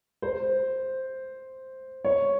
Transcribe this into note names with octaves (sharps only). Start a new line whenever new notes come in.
C5
C#5